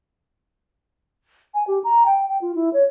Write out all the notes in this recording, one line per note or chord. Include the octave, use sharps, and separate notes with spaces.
G#5
G4
A#5
G5
G5
F4
E4
C#5